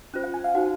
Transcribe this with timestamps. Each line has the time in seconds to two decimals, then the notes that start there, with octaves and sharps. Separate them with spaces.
0.14 C#4 F4 C5
0.24 F#5
0.34 G#5
0.44 F5
0.55 D#4 F#4 C5 F#5